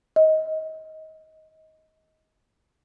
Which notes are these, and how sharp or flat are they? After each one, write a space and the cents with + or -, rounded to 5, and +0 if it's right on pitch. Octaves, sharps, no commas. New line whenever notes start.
D#5 +20